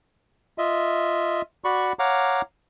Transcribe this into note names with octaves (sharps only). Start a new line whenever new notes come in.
F4 D#5 E5
F#4 D5 B5 C#6
C#5 F5 F#5 A#5 D6